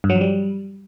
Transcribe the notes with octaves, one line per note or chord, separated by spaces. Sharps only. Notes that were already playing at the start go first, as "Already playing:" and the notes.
G2
F#3
F3
G3